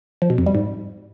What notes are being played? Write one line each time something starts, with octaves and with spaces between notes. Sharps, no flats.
F3
B2
F2
G3
G#2